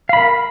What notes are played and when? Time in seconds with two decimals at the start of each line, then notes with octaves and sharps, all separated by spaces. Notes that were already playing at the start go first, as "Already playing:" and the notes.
0.09 F5
0.13 B5
0.17 A#4